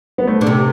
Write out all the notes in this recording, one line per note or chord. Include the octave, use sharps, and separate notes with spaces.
B3
A3
D3
C3